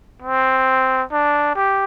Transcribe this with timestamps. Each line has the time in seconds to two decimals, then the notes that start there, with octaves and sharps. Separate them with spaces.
0.22 C4
1.12 D4
1.55 G4